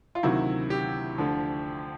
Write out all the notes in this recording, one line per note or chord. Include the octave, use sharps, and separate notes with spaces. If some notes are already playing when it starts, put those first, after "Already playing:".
F4
D2 C3 D#3 F#3 E4
G4
D2 D3 F3